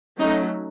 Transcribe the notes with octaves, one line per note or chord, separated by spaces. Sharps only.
F#3 A3 C#4 D#4